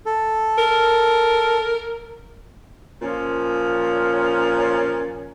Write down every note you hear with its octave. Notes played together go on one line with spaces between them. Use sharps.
A4
A#4
A#2 F3 C#4